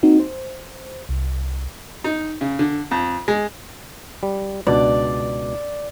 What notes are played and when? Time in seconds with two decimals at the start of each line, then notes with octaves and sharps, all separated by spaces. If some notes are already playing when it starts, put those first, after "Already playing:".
0.03 A#3 C4 D#4 F#4
0.20 C5
1.09 C2
2.04 D#4
2.41 C#3
2.59 D3
2.91 F2
3.28 G#3
4.23 G3
4.67 C#2 B2 D4 D5